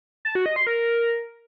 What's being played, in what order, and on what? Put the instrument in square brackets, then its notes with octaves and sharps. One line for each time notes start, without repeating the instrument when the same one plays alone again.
[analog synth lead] A5
F#4
D#5
C6
A#4